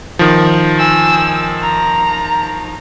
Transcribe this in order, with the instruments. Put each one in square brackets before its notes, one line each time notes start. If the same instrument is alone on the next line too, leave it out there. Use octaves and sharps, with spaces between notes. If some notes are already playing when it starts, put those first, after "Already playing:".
[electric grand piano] D#3 F3
[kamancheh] G#5 E6
A#5